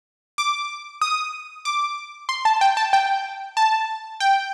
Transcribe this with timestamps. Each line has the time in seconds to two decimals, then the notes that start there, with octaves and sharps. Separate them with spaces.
0.38 D6
1.02 D#6
1.65 D6
2.29 C6
2.45 A5
2.61 G5
2.77 A5
2.93 G5
3.57 A5
4.20 G5